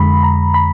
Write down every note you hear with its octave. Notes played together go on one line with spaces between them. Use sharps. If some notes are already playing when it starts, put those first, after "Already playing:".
Already playing: F2 D3 G#3 B5
A#5
B5